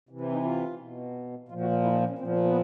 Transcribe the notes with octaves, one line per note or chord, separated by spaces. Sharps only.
C3 E3
C4
D#4
F4
B2
A#2 F3 F4
F#4
F4
E4
D#4
D4
C#4
A#2 F3 C4
B3
A#3
B3